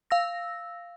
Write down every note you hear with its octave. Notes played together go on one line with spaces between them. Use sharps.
F5 E6 A#6